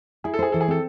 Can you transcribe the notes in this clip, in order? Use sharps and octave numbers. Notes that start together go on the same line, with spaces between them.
E4 G#4
A4
G#4 C5
E3 A4
G#4
C4 A4